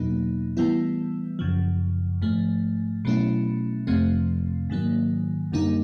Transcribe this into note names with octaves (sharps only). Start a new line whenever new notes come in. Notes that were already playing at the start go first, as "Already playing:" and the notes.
Already playing: E2 B2 F#3 A#3 D#4
A2 E3 G3 B3 E4
F#2 C#3 F3
G#2 F3 A3
B2 F#3 A3 C#4 E4
F2 C3 F3 A3 C4
G#2 D#3 F#3 A#3
F#2 D3 G3 A#3 D#4